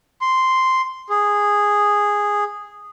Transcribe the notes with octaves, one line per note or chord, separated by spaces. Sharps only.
C6
G#4